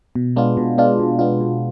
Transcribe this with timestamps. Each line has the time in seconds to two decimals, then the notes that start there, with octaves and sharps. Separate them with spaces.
0.15 B2
0.36 G#3 B3 D4 F4
0.57 B2
0.78 G#3 B3 D4 F4
0.99 B2
1.19 G#3 B3 D4 F4
1.40 B2